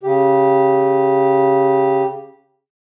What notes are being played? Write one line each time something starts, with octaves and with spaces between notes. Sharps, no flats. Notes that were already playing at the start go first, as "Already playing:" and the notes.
C#3 G4